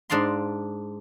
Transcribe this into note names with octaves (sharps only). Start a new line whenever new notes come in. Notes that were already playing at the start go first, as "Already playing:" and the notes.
G#2 D4 D5 F5 C6